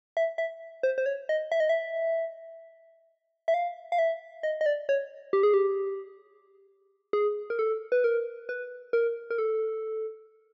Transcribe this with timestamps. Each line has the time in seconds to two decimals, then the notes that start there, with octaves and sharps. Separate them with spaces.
0.17 E5
0.38 E5
0.83 C5
0.98 C5
1.06 C#5
1.29 D#5
1.52 E5
1.60 D#5
1.69 E5
3.48 E5
3.54 F5
3.92 F5
3.98 E5
4.43 D#5
4.61 D#5
4.66 D5
4.89 C#5
5.33 G4
5.43 G#4
5.54 G4
7.13 G#4
7.50 A#4
7.59 A4
7.92 B4
8.04 A#4
8.49 B4
8.93 A#4
9.30 A#4
9.38 A4